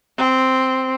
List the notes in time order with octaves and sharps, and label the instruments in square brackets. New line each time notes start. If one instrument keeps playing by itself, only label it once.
[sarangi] C4